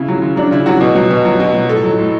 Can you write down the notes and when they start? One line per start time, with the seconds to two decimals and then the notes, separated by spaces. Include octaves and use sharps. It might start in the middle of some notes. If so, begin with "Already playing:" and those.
Already playing: C#3 E4
0.08 F#3
0.22 C#3
0.37 F#3 D4
0.51 C#3 E4
0.66 F#3 F#4
0.81 B2
0.95 F#3
1.10 B2
1.25 F#3
1.40 B2
1.55 F#3
1.69 A2 A4
1.84 F#3
1.98 A2